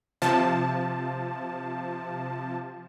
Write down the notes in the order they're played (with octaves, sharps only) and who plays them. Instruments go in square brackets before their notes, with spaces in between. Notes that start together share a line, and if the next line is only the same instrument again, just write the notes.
[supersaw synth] C3 F3 A5